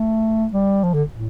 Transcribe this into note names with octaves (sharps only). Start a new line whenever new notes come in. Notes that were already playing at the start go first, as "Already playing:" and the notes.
Already playing: A3
G3
F3
D3
A2